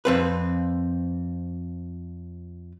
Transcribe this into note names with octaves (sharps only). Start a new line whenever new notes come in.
F2 C4 B4